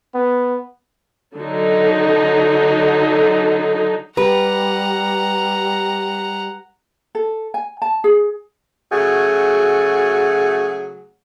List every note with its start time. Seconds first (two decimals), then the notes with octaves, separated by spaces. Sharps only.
0.15 B3
1.35 D3 F#3 D#4
4.17 G3 G4 B4 F#5 A#5
7.15 A4
7.54 G#5
7.82 A5
8.04 G#4
8.92 C#3 F#3 A3 F#4 G#4